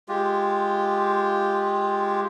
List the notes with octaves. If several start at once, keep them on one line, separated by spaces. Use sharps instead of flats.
G#3 F4 G4